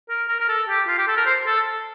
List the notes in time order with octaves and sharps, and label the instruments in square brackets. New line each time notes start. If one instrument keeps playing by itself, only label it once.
[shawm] A#4
A#4
A#4
A4
G4
F4
G4
A4
A#4
C5
A4